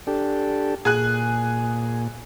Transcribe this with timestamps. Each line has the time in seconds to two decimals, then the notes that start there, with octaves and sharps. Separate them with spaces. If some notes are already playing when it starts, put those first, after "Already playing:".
0.07 D4 G4 A4
0.85 A#2 G#4 G#5 F#6